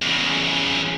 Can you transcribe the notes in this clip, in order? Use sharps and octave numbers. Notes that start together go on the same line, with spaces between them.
E2 C#3